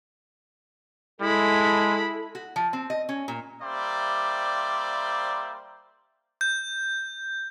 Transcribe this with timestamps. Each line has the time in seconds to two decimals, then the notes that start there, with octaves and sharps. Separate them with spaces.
1.21 G#3 E4 A4 B5
2.35 F#4
2.56 F3
2.73 C4
2.90 D#5
3.09 C#4
3.28 A#2
3.62 G3 A#3 C5 D5 E5
6.41 G6